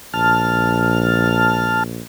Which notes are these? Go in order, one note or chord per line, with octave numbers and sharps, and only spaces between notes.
A#1 A5 F6